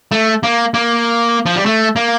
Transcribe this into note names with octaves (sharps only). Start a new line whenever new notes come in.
A3
A#3
A#3
F3
G3
A3
A#3